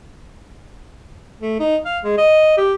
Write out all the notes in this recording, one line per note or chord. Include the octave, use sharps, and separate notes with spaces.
A3
D#4
F5
G#3
D#5
G4